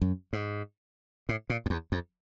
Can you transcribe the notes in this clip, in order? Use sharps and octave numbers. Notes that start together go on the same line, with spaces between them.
F#2
G#2
A2
A#2
F2
E2
F2